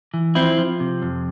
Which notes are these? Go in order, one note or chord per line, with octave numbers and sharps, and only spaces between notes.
E3
F3 C4 E4
F3
C3
F2